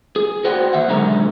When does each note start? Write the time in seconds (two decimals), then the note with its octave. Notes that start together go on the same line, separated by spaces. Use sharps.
0.16 G#4
0.44 F#4 B4 C5 D5 F#5 G5
0.73 D#2 E5 F#5
0.88 B1 D3 D#3 G#3 A#5